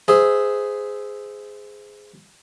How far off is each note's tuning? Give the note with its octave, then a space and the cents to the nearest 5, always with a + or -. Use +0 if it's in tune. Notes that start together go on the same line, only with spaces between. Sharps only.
G#4 +0 C5 -20 E5 +0